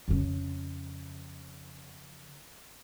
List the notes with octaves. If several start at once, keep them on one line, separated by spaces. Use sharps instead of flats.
F2 C#3